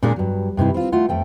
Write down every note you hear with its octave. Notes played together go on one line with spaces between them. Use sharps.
A#2 G#3 D4 G#4 A#4 D5
G2 F#3
G2 C3 D#4 E4
C4 F4
A3 F4 F#5
F2 A3 G5